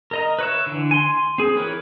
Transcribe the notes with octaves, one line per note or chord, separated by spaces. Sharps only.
A#4 D#5 A#5
B4 C#5 E5
D3 E3
G#5 C6
C4 G#4
E3 A#4 B4 C#5